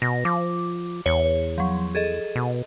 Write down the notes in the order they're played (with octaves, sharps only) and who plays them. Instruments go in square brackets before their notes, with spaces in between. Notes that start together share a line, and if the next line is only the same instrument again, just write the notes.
[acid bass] B2 [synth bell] A#6
[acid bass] F3 [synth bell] D6
[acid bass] E2 [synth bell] C#5
[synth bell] F3 F#3
G#4 A4 D#5
[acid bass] B2